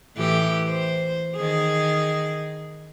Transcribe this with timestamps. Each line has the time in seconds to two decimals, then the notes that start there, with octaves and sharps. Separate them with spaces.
0.16 A2 E3 G4
0.68 C5
1.36 D#3 G#4